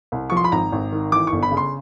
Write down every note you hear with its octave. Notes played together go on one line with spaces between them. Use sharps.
C2
F3 C#6
C6
B5
G#1 A#5
G#1
D#3
E3 D6
G1 C#6
B5
C#3
C6